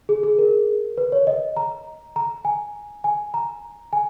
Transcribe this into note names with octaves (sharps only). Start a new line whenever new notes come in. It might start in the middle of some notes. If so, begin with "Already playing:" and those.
G#4
G#4
A#4
B4
C#5
D#5
A#5
A#5
G#5
G#5
A#5
G#5